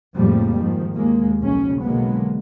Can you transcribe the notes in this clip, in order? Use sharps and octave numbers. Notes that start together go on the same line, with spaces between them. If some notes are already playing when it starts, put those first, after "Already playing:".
F2 A2 C#3 F3 G3 A#3
G#2 D#3 F3
D#2 G#3 A#3
B1 F2 C#3 C#4
B2 D3 F#3 G#3 A#3 B3